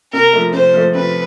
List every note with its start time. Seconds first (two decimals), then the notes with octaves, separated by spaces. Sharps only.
0.13 C3 A#4
0.33 F3 A3
0.53 C3 C5
0.74 F3 A3
0.94 C3 B4